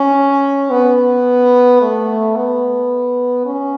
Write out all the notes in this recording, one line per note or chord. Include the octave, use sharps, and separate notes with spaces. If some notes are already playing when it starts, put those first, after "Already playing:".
Already playing: C#4
B3
A3
B3
C#4